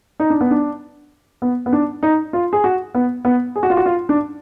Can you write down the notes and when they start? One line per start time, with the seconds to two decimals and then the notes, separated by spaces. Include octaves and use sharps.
0.20 D#4
0.30 D4
0.41 B3
0.51 D4
1.42 B3
1.66 B3
1.73 D4
2.03 D#4
2.33 F4
2.53 G#4
2.64 F#4
2.95 B3
3.25 B3
3.56 G#4
3.63 F#4
3.70 F4
3.77 F#4
3.86 F4
4.09 D4